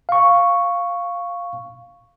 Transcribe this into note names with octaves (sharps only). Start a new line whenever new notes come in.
F5 C#6